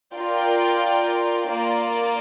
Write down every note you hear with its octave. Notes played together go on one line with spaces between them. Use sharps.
F4 A#4 D5 G5
A#3 F4 D5